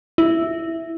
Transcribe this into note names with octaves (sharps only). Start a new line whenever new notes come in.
E4